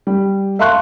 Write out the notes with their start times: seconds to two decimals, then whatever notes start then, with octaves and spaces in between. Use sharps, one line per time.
0.07 G3
0.59 E5 F5 A5 C6 C#6 F#6